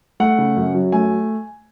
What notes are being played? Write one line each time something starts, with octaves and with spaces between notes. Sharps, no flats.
A3 F#5
C#3
F#2
F#3
A3 G#5